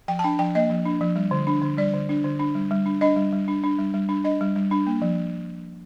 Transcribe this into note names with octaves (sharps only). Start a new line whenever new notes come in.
F3 G5
A5
D4 G5
F3 G5
A#3 D#5
F3
D4
F3
G3
D3
D4
D3
G3 D5
D3
D4
D3
D4
G3
G3
D4
D4 D#5
G3
G3
D4
D4
G3
G3
D4
D4 D#5
G3
G3
D4
A#3
F3